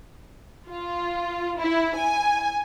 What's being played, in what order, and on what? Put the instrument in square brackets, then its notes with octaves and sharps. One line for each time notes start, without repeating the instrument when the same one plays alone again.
[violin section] F4
E4
G#5